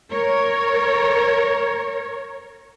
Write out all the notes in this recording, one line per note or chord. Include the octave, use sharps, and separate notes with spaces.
A#4 C#5